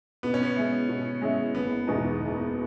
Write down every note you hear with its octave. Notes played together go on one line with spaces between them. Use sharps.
B2 B3
C#4
B3
G#3 C#4 E4
B2
G#3 C#4 E4
F#1 B3
E2 B2 G#3 D#4
F#1